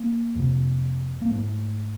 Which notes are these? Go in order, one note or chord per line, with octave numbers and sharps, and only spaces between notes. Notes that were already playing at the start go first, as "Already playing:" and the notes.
Already playing: A#3
F2 C3
A#3
G#2 A3